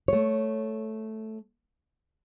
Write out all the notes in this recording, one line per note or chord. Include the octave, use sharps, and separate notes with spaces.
A3 C#5